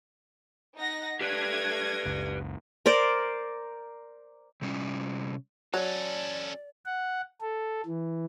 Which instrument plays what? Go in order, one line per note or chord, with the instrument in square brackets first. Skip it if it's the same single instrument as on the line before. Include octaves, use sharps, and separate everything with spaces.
[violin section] D#4 F#5 A#6
[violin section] A3 G#6 A#6 [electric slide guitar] G4 B4 D5
[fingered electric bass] F#1 C#2
[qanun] A#4 C5 D5
[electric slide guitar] C3 G3 C#4
[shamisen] F#3 [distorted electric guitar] C#4 A4 [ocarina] D5
[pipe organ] F#5
A4
E3